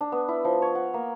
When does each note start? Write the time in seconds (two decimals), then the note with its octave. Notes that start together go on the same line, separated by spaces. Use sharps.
0.01 D4
0.12 B3
0.28 E4
0.45 F3
0.62 C#5
0.75 F#5
0.94 A#3